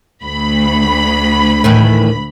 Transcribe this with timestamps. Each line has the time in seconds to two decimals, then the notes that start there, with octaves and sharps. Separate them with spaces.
0.23 D2 B5
1.64 A2 D#3 E3